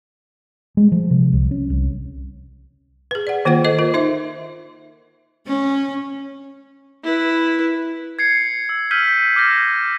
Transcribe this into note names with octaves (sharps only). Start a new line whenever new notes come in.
G#3
F3
C3
C2
C#4
C2
G#4 B4
D5 F#5
D#3 A#3 F4 C5 F#5
A4 C5 D#5 D6
F4 A#4
D#4 C5 E5
C#4
E4 B4
G#6 C7 C#7
E6
E6 F6 G6 B6 D#7
G6
D6 F6 G6 A#6